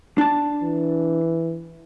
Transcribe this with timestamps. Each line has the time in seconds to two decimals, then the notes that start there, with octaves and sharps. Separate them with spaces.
0.18 D4 A5
0.63 E3